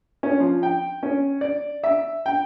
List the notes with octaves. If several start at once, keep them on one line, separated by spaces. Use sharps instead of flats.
C#4
F3
G5
C#4
D5
E5
G5